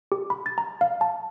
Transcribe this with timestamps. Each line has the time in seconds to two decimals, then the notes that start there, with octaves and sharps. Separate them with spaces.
0.12 G4
0.30 B5
0.46 A6
0.58 A#5
0.81 F5
1.01 A5